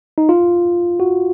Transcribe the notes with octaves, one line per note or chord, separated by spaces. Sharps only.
D#4
F4
F#4